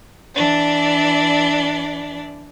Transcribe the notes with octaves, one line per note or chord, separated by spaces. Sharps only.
E3 D4 D5